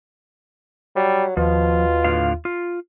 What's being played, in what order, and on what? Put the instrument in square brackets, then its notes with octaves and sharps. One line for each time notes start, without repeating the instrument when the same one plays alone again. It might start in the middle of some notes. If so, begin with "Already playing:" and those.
[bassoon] F#3 [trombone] G3
[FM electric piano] D#2 [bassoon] B2 [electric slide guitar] F3 [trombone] F4
[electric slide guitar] A2 D3 F5
F4